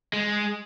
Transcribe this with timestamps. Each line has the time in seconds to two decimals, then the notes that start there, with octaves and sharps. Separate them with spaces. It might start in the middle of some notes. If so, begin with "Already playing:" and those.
0.13 G#3